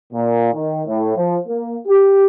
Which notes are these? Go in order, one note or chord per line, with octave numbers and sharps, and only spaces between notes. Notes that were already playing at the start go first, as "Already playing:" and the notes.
A#2
D#3
A2
F3
A#3
G4